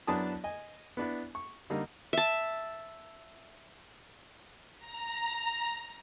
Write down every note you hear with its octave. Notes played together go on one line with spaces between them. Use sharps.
F#2 B3 D4 E4 A5 D#6
D#5 G#5
B3 D4 E4
C#6
D3 G3 A#3 D#4
E5 A5
A#5